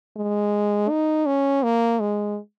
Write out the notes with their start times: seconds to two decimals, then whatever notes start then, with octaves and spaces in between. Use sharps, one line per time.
0.17 G#3
0.89 D#4
1.26 C#4
1.64 A#3
2.00 G#3